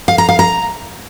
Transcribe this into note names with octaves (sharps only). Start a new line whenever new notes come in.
F5
A#5
F5
A#5